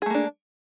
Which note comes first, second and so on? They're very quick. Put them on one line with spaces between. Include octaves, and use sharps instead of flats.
G#4 A3 A#3 D4